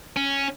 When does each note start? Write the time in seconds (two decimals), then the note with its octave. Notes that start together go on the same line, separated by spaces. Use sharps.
0.16 C#4